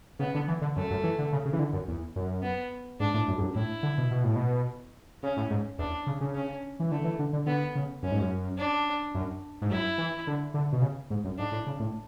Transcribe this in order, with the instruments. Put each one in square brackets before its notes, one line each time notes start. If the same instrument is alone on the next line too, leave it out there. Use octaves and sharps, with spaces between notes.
[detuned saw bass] C#3 [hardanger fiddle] B3
[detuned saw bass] D3
E3
D3
[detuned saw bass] F#2 [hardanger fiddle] A3
[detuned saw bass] F#2
E3
D3
C#3
C#3
E3
D3
F#2
E2
F#2
[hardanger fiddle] B3
[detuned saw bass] G#2 [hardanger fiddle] D4
[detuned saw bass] A2
F#2
G#2
F#2
[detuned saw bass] A2 [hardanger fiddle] E4
[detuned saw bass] D3
B2
B2
A2
B2
[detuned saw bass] C#3 [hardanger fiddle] C#4
[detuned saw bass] A2
G#2
[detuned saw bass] E2 [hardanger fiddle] D4
[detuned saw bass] C#3
C#3
[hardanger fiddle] C#4
[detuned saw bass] E3
[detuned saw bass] D3 [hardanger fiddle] A3
[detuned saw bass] E3
D3
D3
[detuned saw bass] D3 [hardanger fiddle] B3
[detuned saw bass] C#3
[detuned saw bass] F#2 [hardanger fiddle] C#4
[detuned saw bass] G#2
F#2
[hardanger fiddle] D4
[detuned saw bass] F#2
G#2
[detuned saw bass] F#2 [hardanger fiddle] E4
[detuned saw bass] E3
D3
D3
B2
C#3
G#2
F#2
[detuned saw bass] G#2 [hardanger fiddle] D4
[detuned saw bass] A2
C#3
A2